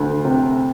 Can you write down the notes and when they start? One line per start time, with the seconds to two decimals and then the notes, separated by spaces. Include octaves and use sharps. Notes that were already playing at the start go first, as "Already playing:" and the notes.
Already playing: D2
0.25 C3